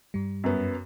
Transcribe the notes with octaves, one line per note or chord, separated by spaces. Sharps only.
G2 G3
F#2 B3